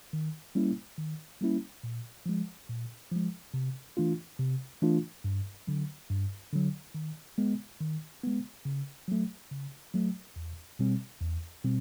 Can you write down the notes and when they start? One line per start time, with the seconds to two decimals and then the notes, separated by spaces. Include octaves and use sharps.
0.13 D#3
0.55 G3 A#3 C#4 E4
0.98 D#3
1.41 G3 A#3 C#4 E4
1.83 A#2
2.26 F3 G#3
2.69 A#2
3.12 F3 G#3
3.54 C3
3.97 E3 A3 D4 F4
4.39 C3
4.82 E3 A3 D4 F4
5.24 G2
5.67 D3 F#3
6.10 G2
6.53 D3 F#3
6.95 D#3
7.38 G#3 B3
7.81 D#3
8.24 G#3 B3
8.65 C#3
9.08 F#3 A3
9.51 C#3
9.94 F#3 A3
10.36 E2
10.79 B2 G3 C4
11.21 E2
11.64 B2 G3 C4